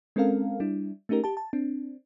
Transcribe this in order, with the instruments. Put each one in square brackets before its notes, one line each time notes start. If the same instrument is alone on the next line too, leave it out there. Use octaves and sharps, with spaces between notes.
[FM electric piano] G#3 C4 C#4 A4 A#4 F5
G3 D4 E4
A3 C#4 D#4 G4 A#4
G4 A5
A5
C4 D4